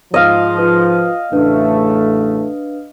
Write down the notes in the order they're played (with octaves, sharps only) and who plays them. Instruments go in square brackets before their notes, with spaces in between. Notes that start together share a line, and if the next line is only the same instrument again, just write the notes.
[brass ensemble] G#2 F3 [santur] D#5 F5
[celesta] F4 B4
[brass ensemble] A1 C#3 A3 [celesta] D4 B4